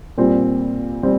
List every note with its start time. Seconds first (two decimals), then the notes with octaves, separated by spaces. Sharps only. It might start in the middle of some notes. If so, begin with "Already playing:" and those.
0.18 A#2 G3 C4 F4
1.03 G3 C4